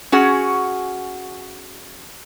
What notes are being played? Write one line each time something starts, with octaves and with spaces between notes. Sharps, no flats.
C#4 F#4 G#4 F#5